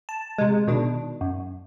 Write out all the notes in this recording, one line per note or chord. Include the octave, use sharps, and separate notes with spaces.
A5
C3 G#3
B2 D#3 D4
F#2